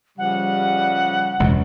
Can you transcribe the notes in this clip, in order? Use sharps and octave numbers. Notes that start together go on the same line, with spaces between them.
C#3 F3 G3 F#5
E1 C#2 F#2 C#3